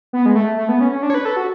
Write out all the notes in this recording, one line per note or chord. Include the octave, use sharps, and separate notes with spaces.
B3
G#3
A3
A3
B3
C#4
C#4
D4
C#5
B4
A4
F#4